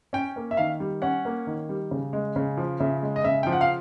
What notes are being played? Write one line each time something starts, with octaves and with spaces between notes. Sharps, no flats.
C#4 G5
A#3
E5
D#3 F5
G3
C#4 F#5
A#3
D#3
G3
C#3
G#3
C#3
F3
C#3 E5
G#3
D#5
C#3 E5
G5
F3
F#5
F5